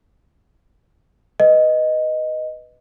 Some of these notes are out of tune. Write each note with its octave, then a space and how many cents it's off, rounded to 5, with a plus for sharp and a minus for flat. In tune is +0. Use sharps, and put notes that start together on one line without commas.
B4 +0 D#5 +0